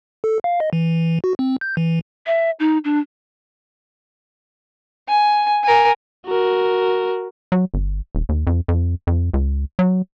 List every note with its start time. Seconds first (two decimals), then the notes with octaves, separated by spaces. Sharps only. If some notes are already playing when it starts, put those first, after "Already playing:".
0.24 A4
0.44 F5
0.60 D#5
0.73 E3
1.24 F#4
1.39 C4
1.61 G6
1.77 E3
2.26 E5
2.60 D#4
2.85 D4
5.08 G#5
5.63 A#4 G#5
6.26 F#4 A#4
7.52 F#3
7.74 G1
8.15 D#1
8.29 D#2
8.47 F2
8.68 F2
9.07 F2
9.34 C#2
9.79 F#3